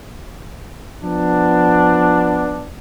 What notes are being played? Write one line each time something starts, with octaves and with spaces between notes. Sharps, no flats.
F3 B3 D4